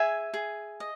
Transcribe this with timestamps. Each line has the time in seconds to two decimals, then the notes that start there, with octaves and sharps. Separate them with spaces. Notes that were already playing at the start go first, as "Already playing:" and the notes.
Already playing: G#4 E5 G#5
0.34 G#4
0.80 D#5